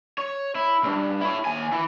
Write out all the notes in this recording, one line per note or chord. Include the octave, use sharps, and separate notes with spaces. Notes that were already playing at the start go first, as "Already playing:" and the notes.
C#5
E4
B1 G2
E4 C#5
D#2 G#5
E3